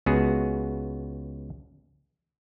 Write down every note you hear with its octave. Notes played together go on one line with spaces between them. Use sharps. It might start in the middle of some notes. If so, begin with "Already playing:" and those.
C#2 B3 F#4 G#4